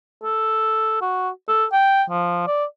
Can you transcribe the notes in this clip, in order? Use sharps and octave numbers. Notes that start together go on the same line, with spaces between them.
A4
F#4
A4
G5
F3
D5